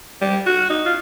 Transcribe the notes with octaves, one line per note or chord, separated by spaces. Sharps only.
G3
F#4
D#4
F4